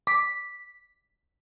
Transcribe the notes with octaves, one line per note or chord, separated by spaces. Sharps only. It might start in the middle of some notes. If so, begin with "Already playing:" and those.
D6 B6